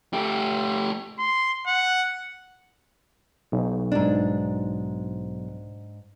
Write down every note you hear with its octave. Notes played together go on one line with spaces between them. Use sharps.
A3 G4
C6
F#5
B1
G#2 D4